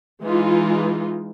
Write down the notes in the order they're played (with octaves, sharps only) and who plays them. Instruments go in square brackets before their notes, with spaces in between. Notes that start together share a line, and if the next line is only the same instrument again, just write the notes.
[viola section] E3 G#3 D#4 F4